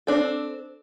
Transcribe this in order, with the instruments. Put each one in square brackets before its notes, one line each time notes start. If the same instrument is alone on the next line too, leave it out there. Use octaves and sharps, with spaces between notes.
[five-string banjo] C4 D4 A4